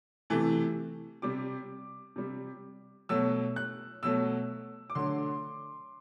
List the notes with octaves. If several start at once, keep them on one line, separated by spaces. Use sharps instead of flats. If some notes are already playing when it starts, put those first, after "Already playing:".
C3 E3 A3
C3 G3 D6
C3 G3
B2 F#3 A3 E6
F#6
B2 F#3 A3 E6
D6
D3 F#3 A3 C6